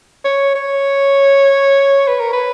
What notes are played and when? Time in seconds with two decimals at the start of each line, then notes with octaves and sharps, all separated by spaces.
0.25 C#5
0.55 C#5
2.07 B4
2.20 A#4
2.33 B4